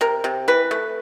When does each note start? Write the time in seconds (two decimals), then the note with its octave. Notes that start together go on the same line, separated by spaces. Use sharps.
0.01 C3 A#4
0.24 C3
0.48 E3 B4
0.71 A3